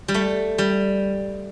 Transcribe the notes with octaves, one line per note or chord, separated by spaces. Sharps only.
G3
A3
G3